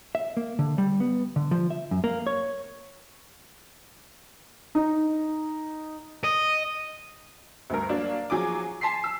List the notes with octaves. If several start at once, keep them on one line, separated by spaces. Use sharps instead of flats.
E5
A#3
D3
G3
B3
D3
F3
E5
F#2
A#3
C#5
D#4
D#5
D2 G2 A#4
F#3 A#3 D4
F3 F#3 G#4 G#5 D6
G#5 A5 C6 B6 C7
E6